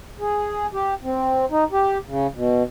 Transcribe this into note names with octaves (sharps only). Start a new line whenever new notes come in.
G#4
G4
C4
D#4
G4
C#3
B2